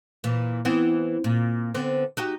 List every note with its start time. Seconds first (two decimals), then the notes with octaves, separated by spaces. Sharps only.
0.24 A#2 E3
0.65 E3 B3 C4
1.24 A#2
1.74 D3 B3 C4
2.17 D#4 F#4 G4